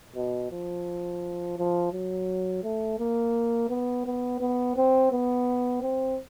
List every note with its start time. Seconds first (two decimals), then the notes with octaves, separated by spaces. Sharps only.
0.16 B2
0.51 F3
1.57 F3
1.93 F#3
2.64 A3
2.99 A#3
3.69 B3
4.06 B3
4.40 B3
4.77 C4
5.12 B3
5.82 C4